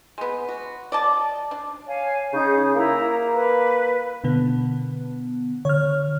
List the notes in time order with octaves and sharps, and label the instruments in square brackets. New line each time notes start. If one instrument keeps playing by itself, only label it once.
[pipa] G#3 B3
F#4
D5 D#5 A5
D4
[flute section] C#5 F5 G#5
[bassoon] C#3 [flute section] D#4 G#4 G6
[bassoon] A#3 [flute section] E4 A#5
[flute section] B4
[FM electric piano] B2 D3 B3
[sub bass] D3 [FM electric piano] C#5 F6